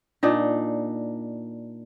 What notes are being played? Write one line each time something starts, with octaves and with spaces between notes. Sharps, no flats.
A#2 D4 D#4